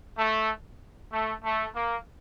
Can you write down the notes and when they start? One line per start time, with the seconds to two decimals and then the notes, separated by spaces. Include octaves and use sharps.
0.18 A3
1.11 A3
1.43 A3
1.74 A#3